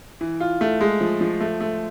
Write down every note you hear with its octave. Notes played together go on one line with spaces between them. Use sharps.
E3
F4
A3
G#3
F3
F3
A3
A3